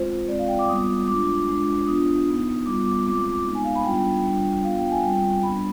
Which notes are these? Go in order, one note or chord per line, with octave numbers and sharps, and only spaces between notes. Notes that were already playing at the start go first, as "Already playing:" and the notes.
Already playing: G#3 C4 F4 C5
G#3 C4 F4 D5
F5
G5
D6
G3 B3 F4 D#6
G#3 D4 F4 D6
G#3 D4 F4
B3 D4 F4 D#6
B3 D#4
G3 B3 F4 D6
D6
G#3 C4 F4 D6
D6
G#3 B3 D#4
G#5
F5
B5
G3 B3 D4 F4 G5
G3 D4 F4
B3 D4 F4 F5
G5
G#5
G3 C4 F4 G5
G3 B3 D4 B5